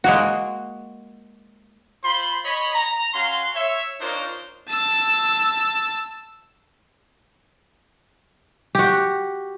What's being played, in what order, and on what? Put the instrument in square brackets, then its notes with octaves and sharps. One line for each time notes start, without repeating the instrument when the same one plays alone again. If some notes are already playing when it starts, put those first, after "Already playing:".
[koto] G#3 A#3 F#4
[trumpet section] F4 C5 B5 C6
C#5 D#5 B5
A#5
C#4 F#4 F5 C6
C#5 E5
D4 D#4 F4 A#4 C5 C#5
[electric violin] A5 E6
[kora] F#4 G4